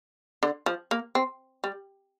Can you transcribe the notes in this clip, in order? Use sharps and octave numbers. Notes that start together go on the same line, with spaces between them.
D3
F3
A#3
C4
G3